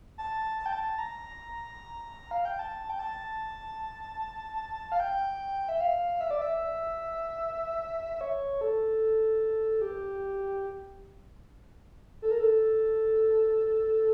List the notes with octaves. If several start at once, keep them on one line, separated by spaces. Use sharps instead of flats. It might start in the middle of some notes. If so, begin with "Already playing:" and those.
A5
A5
G5
A5
A#5
F5
G5
A5
G5
A5
F5
G5
E5
F5
E5
D5
E5
C#5
A4
G4
A4
A#4
A4